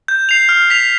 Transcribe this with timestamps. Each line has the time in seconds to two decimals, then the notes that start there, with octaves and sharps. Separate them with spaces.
0.08 G6
0.29 C7 F7
0.49 F6
0.70 B6 F7